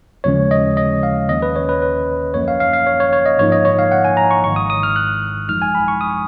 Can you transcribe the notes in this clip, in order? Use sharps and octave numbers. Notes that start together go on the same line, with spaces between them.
D#2 C#3 F3 G#3 C#4 C#5
D#5
D#5
F5
D#2 D#3 A#3 C#4 D#5
B4
C#5
B4
B4
G#1 F#2 F3 A#3 C#4 C#5
F5
F5
F5
C#5
C#5
C#5
D#5
G#2 F3 A#3 D#4 C#5
D#5
C#5
F5
F#5
G#5
A#5
C#6
G#1 G#2 D#3 C#6
D#6
D#6
F6
F#6
G#1 F#2 F3 G#3 D#4 F6
G#5
B5
C#6
D#6